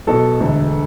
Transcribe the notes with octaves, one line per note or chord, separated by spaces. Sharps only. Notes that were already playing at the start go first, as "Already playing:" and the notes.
B1 B2 A4
E1 D2 D3